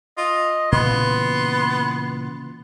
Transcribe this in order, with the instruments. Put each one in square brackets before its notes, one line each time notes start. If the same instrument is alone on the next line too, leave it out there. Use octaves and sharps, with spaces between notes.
[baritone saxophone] F4 [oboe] D#5
[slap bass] A#2 C#3 E3 [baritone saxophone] B3 [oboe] C6